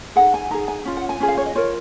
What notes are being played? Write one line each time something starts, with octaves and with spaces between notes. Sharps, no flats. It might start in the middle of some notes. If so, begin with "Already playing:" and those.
D#4 G#4 F#5
G#5
D#4 G#4 A#5
G#5
C#4 F4
F#5
G#5
C#4 F4 G#4
F5
C#5
D#5
F4 A#4 C#5